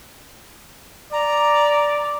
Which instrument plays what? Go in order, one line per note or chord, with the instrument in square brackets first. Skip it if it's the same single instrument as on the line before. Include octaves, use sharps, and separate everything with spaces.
[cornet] D5 [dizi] A#5